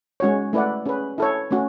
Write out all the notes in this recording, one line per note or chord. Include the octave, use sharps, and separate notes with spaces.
G#3 C#4 F#4 C#5
A3 E4 B4 D5 F#5
C#4 G#4 B4
E4 A4 C#5
A3 C#4 F#4